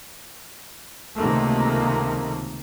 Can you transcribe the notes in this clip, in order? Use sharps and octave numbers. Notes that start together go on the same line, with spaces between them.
C#2 C3 D#3 A3 A#3